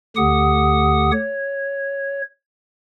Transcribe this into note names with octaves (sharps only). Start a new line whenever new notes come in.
D2 D3 G4 F#5 D#6
C#5